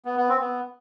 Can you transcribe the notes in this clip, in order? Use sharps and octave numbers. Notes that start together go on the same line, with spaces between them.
B3
B3
C4
B3